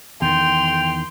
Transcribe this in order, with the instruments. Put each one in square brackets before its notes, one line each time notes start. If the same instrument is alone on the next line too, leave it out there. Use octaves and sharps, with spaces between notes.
[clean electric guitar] E2 D#3 [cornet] G5 [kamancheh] C6 [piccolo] F7